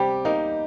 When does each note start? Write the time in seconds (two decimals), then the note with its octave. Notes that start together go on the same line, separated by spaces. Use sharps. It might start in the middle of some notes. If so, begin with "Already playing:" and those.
Already playing: C3 G3 G4
0.25 A#3 D#4